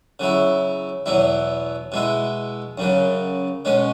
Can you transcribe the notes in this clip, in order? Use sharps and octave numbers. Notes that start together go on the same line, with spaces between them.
C#3 F#3 E4
E2 B2 F#3 E4
B2 G#3 E4
F#2 C#3 F#3
B2 G#3 C#4